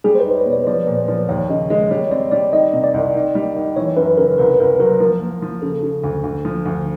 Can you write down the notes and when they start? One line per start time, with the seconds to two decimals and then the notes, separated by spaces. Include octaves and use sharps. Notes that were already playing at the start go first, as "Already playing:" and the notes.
0.04 G3 G#4
0.15 C5
0.20 B4
0.26 D#4
0.36 C#5
0.46 B2
0.52 D5
0.67 F3 D5
0.87 A#2
1.08 F3
1.29 D#2 C#5
1.49 C#3 D#5
1.70 G#3 D#5
1.91 G3 C#5
2.11 C4 D5
2.31 G3 D5
2.52 D#3 D#5
2.73 C3
2.84 D5
2.94 C2
3.15 D#3
3.35 G3
3.56 D#3
3.76 E3 C#5
3.97 F#2 B4
4.17 C#3 A#4
4.38 C2 B4
4.60 C2 A#4
4.79 F#3 A#4
5.00 F3
5.21 A#3
5.42 F3
5.62 C#3 A4
5.83 C#3
6.04 D2
6.24 D2
6.45 F3
6.66 D2